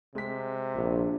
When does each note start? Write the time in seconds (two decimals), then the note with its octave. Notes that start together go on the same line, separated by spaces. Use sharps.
0.15 C3 G#3 B6
0.75 A#1 D4